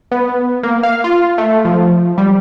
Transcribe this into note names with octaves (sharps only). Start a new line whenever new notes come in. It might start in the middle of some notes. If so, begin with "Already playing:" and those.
B3
A#3
F5
F4
A3
F3
G3